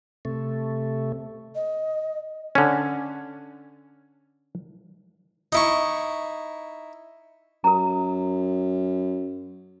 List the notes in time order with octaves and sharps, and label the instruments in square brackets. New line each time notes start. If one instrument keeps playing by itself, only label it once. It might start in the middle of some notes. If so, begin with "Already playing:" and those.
[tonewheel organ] C3 A3
[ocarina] D#5
[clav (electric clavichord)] D3 C#4
[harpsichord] D#4 E4 C#6
[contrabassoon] F#2 [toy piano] A#4 A#5